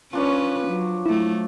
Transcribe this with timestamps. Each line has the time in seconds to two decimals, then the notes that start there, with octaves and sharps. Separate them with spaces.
0.13 F3 C#4 D4 B4 C#5
0.67 F#3
1.06 F#3 A3 E4